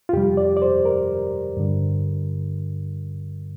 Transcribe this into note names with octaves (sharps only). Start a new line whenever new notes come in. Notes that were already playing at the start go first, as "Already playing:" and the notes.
F4
F2 C3 G3 G4
D5
D5
C5
A#4
G2 D3 G3